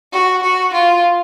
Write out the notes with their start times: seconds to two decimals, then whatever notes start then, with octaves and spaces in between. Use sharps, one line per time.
0.13 F#4
0.43 F#4
0.73 F4